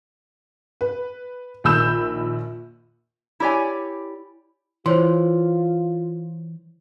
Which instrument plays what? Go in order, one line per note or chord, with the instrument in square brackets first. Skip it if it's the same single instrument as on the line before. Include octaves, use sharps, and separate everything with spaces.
[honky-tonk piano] B4
A#1 D#3 B5 E6 G6 E7
[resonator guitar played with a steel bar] E4 G4 C#5 D5 G#5
[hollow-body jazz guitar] E3 [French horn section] F4 [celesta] C5 C#5 C6